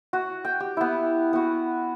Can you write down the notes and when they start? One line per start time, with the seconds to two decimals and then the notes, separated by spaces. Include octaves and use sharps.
0.13 F#4
0.45 G5
0.60 G4
0.77 B3 E4
1.33 B3 F#4